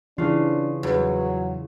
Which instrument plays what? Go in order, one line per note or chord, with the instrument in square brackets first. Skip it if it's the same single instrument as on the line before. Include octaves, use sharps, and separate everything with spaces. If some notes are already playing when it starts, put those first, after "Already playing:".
[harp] C#3 F4 [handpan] E3 [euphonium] D4
[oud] E2 [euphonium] F#3